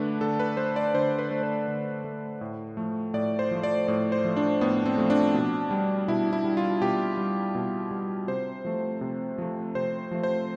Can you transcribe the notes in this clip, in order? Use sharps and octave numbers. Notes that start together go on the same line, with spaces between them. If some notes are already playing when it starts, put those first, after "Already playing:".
Already playing: D3 A3 D4 B4
D3 A4
B4
A3 C5
D5
D3 C5
B4
A3
C5
D3
A3
A2
F3 A3
A2 D5
C5
F3 A3
D5
A2 D5
C5
F3 A3
D4
A2 B3
C4
F3 A3
D4
B2
G3
B2 E4
E4
G3
F4
B2 G4
G3
B2
G3
C3 C5
F3 A3
C3
F3 A3
C3 C5
F3 A3
C5